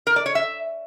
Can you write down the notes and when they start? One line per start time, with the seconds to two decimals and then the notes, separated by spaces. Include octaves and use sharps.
0.07 A#4
0.16 D5
0.26 C#5
0.35 E5